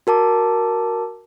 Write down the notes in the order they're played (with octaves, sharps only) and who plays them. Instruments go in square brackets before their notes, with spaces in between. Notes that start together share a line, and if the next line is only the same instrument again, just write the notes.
[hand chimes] F#4 A#4 A5 D6